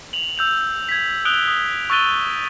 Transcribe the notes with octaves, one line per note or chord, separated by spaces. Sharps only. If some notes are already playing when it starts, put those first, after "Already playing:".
F7 F#7
E6 G6 F7
G#6 B6
D#6 F#6 D7 F7 G7
D#6
C#6 E6 F#6 A6 D#7 G7